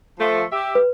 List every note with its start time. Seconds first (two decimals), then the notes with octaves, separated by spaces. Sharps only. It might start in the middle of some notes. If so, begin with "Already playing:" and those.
0.19 F3 A3
0.52 G4 E5
0.75 B4